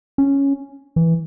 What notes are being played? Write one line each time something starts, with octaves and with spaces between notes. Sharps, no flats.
C#4
E3